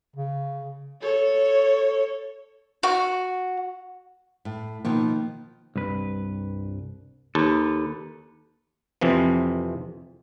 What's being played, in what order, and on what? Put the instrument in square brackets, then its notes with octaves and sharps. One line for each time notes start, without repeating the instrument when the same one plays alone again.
[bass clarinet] C#3
[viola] A4 C#5
[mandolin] F#4
[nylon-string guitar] A2
[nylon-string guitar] B2 D#3 F3 [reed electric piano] A#3
[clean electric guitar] C2 G2 B4
[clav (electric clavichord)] D#2 [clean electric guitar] A4 B4
[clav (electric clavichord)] F2 C3 E3 F3